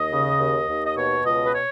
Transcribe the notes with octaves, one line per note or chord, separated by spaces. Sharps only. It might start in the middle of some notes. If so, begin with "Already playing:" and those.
Already playing: D#2 D#5
C#3
D#2
D#2
D#5
B2 C#5
C#2 D#5
B4
C#5